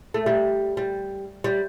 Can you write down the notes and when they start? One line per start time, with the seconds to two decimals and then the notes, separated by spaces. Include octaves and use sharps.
0.14 A3
0.26 G3
0.77 G3
1.44 G3